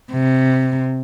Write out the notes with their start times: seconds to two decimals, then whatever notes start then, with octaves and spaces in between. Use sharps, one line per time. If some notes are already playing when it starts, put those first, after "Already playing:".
0.12 C3